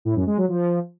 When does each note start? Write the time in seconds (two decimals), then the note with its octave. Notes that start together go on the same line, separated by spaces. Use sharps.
0.05 A2
0.16 F#2
0.27 G#3
0.38 F#3
0.49 F3